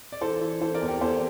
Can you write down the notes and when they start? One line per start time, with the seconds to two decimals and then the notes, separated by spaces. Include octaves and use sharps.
0.12 D5
0.21 E3 A4 C5
0.41 E3
0.61 E3 A4 C5
0.74 A#4 D5
0.81 E2
0.88 G4 A#4
1.01 E2 A4 C5